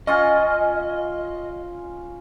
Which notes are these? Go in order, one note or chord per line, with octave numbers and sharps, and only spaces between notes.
C#4 F4 D#5 G#5